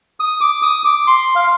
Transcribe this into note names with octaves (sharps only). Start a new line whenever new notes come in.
D#6
D6
D#6
D6
C6
F5